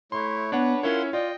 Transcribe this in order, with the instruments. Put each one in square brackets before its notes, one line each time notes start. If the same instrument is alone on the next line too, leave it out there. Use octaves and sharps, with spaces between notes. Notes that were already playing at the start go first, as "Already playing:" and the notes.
[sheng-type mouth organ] A3 E4 C#5 [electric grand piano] C6
[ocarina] B3 [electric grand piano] D4 C#5 F#5 [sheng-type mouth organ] B4
[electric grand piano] C#4 E4 C#5 [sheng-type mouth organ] F4 F#5 C6 [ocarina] A#4
[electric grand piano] F4 [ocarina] D5 [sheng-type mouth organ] D#5 G5